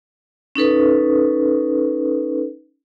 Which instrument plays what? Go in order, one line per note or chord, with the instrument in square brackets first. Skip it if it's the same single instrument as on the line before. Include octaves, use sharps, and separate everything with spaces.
[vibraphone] C#4 D#4 A4 B4